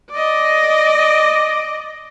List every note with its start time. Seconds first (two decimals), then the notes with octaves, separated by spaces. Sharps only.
0.11 D5 D#5